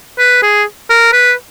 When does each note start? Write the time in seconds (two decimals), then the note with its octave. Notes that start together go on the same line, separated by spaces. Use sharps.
0.18 B4
0.42 G#4
0.90 A#4
1.12 B4